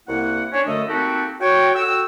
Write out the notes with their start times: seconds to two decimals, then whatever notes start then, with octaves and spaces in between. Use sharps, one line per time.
0.08 C2 A#3 E4 F#5
0.53 C#4 D4 C#5
0.67 F#2 D3 A3 A4 D#5
0.88 A#3 C4 D#4 F#4 G4 A4
1.41 F#4 C#5 G5
1.75 F#4 A4 G5 E6